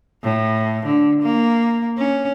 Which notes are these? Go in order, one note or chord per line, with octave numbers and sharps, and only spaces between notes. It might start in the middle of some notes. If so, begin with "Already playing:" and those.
A2
D3
A#3
C#4